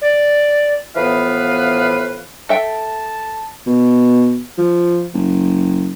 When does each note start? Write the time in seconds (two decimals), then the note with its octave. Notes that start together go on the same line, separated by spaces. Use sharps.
0.02 D5
0.96 A2 E3 F3 B3 B4 F5
2.49 A4 E5 G5 A5
3.66 B2
4.58 F3
5.14 F#1